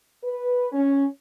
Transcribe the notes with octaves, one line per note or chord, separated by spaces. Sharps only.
B4
C#4